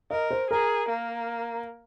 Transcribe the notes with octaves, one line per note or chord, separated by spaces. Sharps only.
A#4 D#5
C5
G#4 A#4
A#3